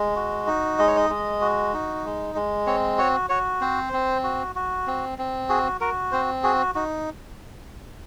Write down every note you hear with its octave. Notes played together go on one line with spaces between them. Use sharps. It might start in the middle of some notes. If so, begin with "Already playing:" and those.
Already playing: G#3
F#4
D#4
G#3 D#5
C#5
D#5
G#3
F#4
D#4
G#3
G#3
C4 C#5
F#4 C#5
F#4 C#5
C4 C5
C4
F#4
F#4
C4
C4
F#4 G#4
F#4 A#4
C4 C5
F#4 G#4
D#4 F#4